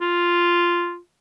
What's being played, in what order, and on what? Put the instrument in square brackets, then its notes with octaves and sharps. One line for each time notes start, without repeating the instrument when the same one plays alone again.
[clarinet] F4